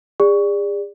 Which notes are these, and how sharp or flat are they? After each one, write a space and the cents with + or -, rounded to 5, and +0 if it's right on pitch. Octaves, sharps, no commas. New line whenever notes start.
G#4 -40 D5 +0